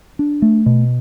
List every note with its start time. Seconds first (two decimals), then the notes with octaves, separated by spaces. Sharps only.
0.19 D4
0.42 A3
0.66 B2